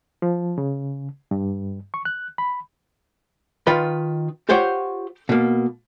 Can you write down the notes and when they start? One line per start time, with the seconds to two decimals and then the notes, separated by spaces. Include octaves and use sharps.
0.22 F3
0.58 C#3
1.31 G2
1.94 C#6
2.05 F#6
2.38 B5
3.67 D#3 F4 B4 C6
4.49 F4 G4 C5 C#5 F#5 G5
5.29 B2 A#3